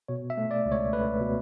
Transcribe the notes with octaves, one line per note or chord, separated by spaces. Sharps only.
B2 C#5
E5
A3
D5
C#2
C#5
A3 B4
B2